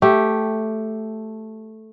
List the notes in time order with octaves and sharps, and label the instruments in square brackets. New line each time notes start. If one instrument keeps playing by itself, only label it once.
[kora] A3 G4